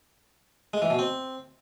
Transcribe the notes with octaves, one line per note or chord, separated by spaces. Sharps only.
G#3
E3
B2
C4